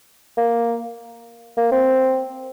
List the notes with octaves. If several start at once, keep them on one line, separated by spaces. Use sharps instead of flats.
A#3
A#3
C4